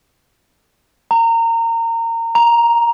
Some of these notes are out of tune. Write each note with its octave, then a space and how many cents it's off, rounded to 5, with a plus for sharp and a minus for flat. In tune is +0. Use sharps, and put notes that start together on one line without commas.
A#5 -25
A#5 +5